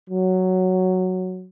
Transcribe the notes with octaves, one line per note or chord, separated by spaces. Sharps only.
F#3